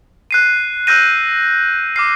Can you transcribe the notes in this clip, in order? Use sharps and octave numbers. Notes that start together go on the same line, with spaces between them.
F#6 C7 D#7
E6 F#6 G6 A#6 D#7
D6 F6 C7